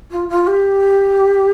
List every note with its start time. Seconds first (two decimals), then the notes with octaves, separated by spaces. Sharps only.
0.10 F4
0.29 F4
0.46 G4